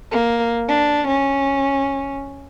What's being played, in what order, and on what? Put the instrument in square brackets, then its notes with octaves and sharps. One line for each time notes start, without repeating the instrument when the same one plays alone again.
[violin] A#3
D4
C#4